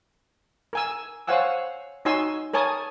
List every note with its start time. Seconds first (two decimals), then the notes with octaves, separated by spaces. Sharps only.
0.73 A#4 G#5 E6
1.27 C5 C#5 F5 F#5 G#5 E6
2.05 D#4 F#4 C#5 G#5 C6 E6
2.53 A#4 C#5 G#5 A5 D#6